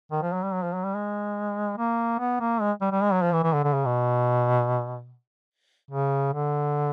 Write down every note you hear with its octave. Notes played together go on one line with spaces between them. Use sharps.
D#3
F3
F#3
G3
F#3
F3
F#3
G3
G#3
A#3
B3
A#3
G#3
G3
G3
G#3
F#3
F3
E3
E3
D3
D3
C#3
B2
C#3
D3